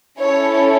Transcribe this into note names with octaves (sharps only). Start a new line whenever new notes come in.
C#4 E4 A4 C#5